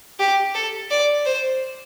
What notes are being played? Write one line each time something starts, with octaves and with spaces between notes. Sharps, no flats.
G4
A4
D5
C5